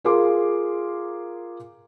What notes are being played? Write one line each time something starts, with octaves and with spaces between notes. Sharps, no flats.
F4 G#4 A#4 F5 C6 D6